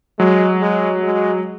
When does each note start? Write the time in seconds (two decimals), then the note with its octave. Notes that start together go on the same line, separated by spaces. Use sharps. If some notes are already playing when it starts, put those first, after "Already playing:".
0.19 F#3 G#3
0.61 G#3
1.03 G#3